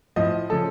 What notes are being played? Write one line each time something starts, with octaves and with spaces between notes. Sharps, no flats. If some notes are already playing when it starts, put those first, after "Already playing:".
A2 F3 D#5
C#3 F3 A4